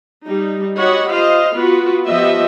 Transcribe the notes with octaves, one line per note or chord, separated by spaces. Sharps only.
G3 D#4
F#4 G4 C#5 D#5 F#5 B5
F4 C5 D#5 F5
B3 F4 F#4 B4
F3 B3 G4 D#5 E5